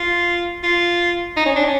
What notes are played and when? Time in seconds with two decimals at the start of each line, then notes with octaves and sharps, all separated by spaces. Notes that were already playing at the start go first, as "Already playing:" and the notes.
Already playing: F4
0.63 F4
1.37 D#4
1.46 C#4
1.56 D4
1.65 C#4